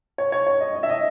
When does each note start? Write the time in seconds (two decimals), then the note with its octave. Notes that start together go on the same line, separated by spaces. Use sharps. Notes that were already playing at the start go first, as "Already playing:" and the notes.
0.18 C#5
0.32 C#5
0.47 C#5
0.60 D#5
0.75 D#5
0.83 E5
0.89 D#5